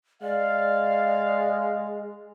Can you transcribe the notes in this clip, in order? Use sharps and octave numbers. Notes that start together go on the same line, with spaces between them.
G#3 D5 F5